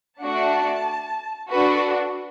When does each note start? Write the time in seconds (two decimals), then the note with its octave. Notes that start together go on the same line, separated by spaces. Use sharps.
0.22 A3 D4 F#4 A5
1.50 D4 F#4 A4 B4